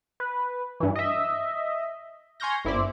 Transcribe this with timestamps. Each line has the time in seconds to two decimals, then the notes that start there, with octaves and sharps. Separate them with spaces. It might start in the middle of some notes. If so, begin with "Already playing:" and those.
0.20 B4
0.80 G2 E3
0.95 D#5 E5
2.40 G#5 C6 C#6 F6 G6 A#6
2.65 G1 E4 C5 D5